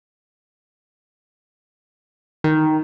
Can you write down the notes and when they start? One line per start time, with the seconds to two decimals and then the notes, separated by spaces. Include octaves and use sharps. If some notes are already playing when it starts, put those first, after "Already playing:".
2.44 D#3